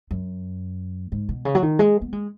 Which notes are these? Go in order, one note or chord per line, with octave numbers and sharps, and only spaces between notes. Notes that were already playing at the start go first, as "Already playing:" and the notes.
F#2
G#2
B2
C#3
F#3
D#3
G#3
B3
G#3